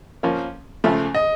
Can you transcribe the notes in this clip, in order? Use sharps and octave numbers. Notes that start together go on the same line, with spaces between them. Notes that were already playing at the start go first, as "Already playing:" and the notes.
F3 A#3 C#4
C#2 C#3 F3 A3
D#5